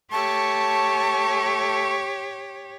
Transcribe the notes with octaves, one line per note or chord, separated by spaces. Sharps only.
A3 G4 C#5 A5 C#6